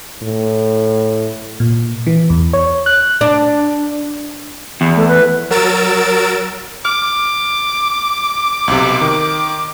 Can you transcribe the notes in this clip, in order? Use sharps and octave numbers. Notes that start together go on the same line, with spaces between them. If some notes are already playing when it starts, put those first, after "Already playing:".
A2
A#2
E3
E2
C#5
F#6
D4
E2
A3
B4
F#3 A#4 E6 A6 D7 E7
D6 F6
B1 C3
D#3